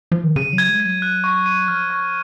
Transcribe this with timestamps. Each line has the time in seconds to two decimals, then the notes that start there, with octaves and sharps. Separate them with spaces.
0.12 F3
0.24 D#3
0.36 C#3 D#7
0.53 F#3
0.58 G#6
0.69 G#3
0.80 G#6
0.86 F#3
1.02 F#6
1.24 C#6
1.46 D#7
1.68 F3 F6
1.90 C#6